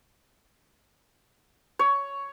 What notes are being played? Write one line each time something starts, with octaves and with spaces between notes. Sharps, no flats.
C#5